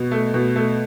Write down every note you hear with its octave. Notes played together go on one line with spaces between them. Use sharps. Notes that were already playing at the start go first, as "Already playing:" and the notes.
Already playing: B2
A3
B2
A3